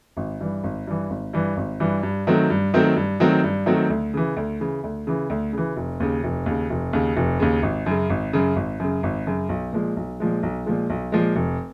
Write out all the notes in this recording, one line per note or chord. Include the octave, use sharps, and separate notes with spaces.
G#1
G2 E3
G#1
G2 E3
G#1
G2 E3
G#1
G2 E3
G2
D#3 F#3 A3 C4
G2
D#3 F#3 A3 C4
G2
D#3 F#3 A3 C4
G2
D#3 F#3 A3 C4
D2
C#3 E3
D2
C#3 E3
D2
C#3 E3
D2
C#3 E3
F1
D#2 C#3
F1
D#2 C#3
F1
D#2 C#3
F1
D#2 C#3
G#1
F#2 C#3
G#1
F#2 C#3
G#1
F#2 C#3
G#1
F#2 C#3
B1
A#2 F3 G#3
B1
A#2 F3 G#3
B1
A#2 F3 G#3
B1
A#2 F3 G#3
F1